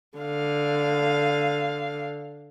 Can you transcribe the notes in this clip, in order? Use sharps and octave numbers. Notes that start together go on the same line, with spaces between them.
D3 F5